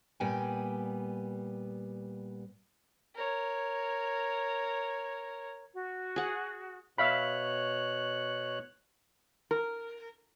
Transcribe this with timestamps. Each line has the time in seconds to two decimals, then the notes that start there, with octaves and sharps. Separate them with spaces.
0.20 A#2 G3 B3 G5 G#5
3.15 A#4 C#5
5.74 F#4
6.16 G#4 F#5
6.98 B2 C#5 E5 F5 B5 F#6
9.51 A#4